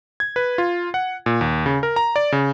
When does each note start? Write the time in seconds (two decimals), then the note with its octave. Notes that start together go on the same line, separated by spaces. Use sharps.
0.20 G#6
0.36 B4
0.58 F4
0.94 F#5
1.26 A#2
1.41 D#2
1.66 C#3
1.83 A#4
1.96 A#5
2.16 D5
2.32 C#3